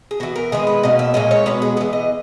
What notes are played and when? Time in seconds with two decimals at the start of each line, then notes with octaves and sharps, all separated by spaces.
0.11 G#4
0.20 E3 B3 F#4
0.36 A#4
0.52 D#3 G#3 B3 G#4
0.67 B4
0.83 B2 A#3 C#4 D#5
0.99 E5
1.14 A#2 G#3 C#4 D#5
1.31 C#5
1.46 B2 G#3 B3 B4
1.62 G#4
1.77 E3 B3 G#4
1.93 D#5